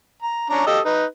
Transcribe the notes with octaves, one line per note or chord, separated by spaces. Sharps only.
A#5
C#4 D4 A#5
G4 A4 D#5
D#4 B4